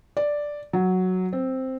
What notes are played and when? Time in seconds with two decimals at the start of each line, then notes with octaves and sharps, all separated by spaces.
0.17 D5
0.73 F#3
1.33 C4